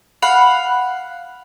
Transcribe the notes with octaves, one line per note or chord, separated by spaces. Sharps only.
F5 F#5 B5